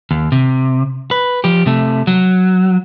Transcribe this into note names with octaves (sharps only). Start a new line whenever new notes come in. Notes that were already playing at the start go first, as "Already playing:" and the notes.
D#2
C3
B4
F3 G4
C3 A3
F#3